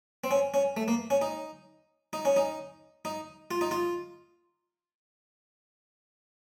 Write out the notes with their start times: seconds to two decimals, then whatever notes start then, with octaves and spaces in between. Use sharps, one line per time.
0.24 C4
0.31 C#4
0.54 C#4
0.77 A3
0.88 A#3
1.10 C#4
1.22 D#4
2.13 D#4
2.25 C#4
2.36 D#4
3.05 D#4
3.51 F4
3.61 D#4
3.71 F4